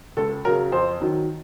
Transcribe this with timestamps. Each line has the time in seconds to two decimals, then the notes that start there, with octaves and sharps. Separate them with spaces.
0.17 C#2 A4
0.44 C#3 F#3 A#4
0.72 F2 C5
1.00 D#3 F#3